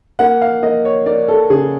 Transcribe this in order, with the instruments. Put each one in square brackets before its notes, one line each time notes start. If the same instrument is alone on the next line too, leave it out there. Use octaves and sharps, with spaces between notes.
[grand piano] A#3 F#5
F5
A#3 D#5
C#5
A#3 D5
A4
C#3 G#4